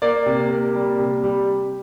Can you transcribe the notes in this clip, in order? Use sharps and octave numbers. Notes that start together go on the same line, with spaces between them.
A#3 D5
C3
A#3
G3
C3
G3